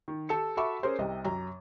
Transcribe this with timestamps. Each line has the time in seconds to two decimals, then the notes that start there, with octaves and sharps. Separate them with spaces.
0.08 D#3
0.29 G4 A4 E6 C#7
0.57 F#4 A4 E5 B5 C#6 D6
0.83 C#4 G#4 A#4 C5
0.99 C2 C3 D#5
1.25 F#2 A#5